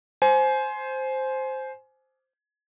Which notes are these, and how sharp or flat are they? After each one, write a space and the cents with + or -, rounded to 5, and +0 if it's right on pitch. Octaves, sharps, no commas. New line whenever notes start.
C5 +0 G#5 +25